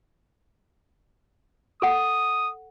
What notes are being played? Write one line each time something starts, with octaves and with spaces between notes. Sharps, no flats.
A4 F#5 D#6